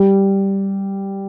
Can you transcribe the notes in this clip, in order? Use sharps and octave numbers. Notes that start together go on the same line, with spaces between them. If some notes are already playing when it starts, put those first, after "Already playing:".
Already playing: G3